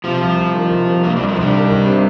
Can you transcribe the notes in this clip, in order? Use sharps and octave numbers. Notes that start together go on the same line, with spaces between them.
C3 F3 F4
C2
C2
D#3
C2
C3
C2 A#2 A#3
C2 G2 G3
F2 F3
C2 G2 G3
D#3
C2
C3